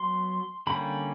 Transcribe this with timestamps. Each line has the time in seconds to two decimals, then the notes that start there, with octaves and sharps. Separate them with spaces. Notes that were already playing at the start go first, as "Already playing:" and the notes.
Already playing: F#3 B3 C6
0.67 D3 G3 A#3 C#4 B5